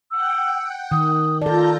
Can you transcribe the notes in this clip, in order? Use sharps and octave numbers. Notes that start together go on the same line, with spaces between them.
F#5 G5 E6
D#3 D#6
F4 A4 D5 A5 A#5 G6